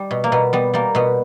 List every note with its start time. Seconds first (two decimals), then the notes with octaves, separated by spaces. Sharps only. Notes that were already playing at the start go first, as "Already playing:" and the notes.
Already playing: G3
0.11 B2
0.24 A#3
0.32 B2 B3
0.53 G3 B3
0.74 G3 A#3
0.95 B2 B3